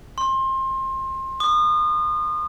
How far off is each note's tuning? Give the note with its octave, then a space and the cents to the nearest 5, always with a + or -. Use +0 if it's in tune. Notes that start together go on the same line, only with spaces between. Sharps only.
C6 +25
D#6 -35